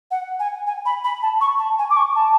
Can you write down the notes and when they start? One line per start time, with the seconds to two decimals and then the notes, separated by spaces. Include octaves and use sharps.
0.11 F#5
0.39 G#5
0.66 G#5
0.85 B5
1.04 B5
1.22 A5
1.40 C#6
1.58 A5
1.78 G#5
1.90 D6
1.96 C#6
2.15 A5